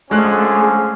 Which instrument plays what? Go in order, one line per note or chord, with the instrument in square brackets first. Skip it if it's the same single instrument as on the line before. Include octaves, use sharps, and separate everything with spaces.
[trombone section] D3 F3 C#4 [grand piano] G#3 F#6 [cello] A3 [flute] G#4